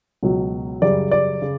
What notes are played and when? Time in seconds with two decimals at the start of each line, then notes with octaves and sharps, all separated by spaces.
0.23 C#2 B2 F#3
0.82 F#2 C#3 G3 D5
1.11 D5
1.42 C#3